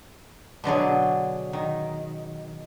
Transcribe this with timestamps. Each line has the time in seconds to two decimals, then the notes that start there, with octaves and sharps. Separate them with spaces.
0.64 B2 D3 F#3 G#4
1.53 D#3